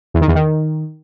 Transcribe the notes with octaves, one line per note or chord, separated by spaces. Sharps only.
E2
D#3
E2
D#3